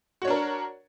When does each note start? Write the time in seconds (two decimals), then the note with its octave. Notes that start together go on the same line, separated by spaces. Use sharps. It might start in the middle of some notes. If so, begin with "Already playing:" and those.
0.22 F#4
0.25 C#5
0.27 D4
0.30 A#4